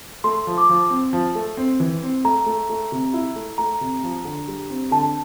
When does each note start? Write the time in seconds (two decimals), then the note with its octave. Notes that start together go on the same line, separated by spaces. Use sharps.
0.24 A3 C6
0.47 F3
0.58 D6
0.69 F3
0.90 C4
1.13 F3
1.35 A3
1.57 C4
1.80 E3
2.03 C4
2.24 A3 A#5
2.46 A3
2.70 A3
2.92 C3
3.14 E4
3.36 A3
3.58 A3 A#5
3.81 C3
4.03 F3
4.25 D3
4.48 G3
4.70 C4
4.91 D3 A5